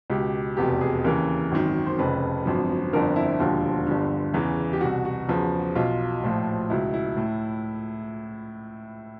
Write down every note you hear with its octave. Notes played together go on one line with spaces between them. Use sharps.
C#2 B2 G4
F1 E2 B2 G4
G#4
D#2 C#3 E3 A#4
G#1 F#2 D#3
C5
F1 F2 C#3 B4
G#1 F#2 D3 F3
G1 F2 D3 F3 A#4
E4
E1 D#2 D3 F3 F4
G1 G2 D3
E2 C#3 E3
G4
C2 B2 F#4
F#4
E2 C#3 F3
B1 B2 F4
A#1 A2 F3
C#2 B2 E4
E4
A2